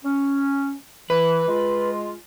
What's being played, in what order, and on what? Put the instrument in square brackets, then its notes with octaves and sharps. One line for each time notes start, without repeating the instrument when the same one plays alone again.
[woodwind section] C#4
[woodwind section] E3 [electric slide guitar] B4
[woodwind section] G#3 F4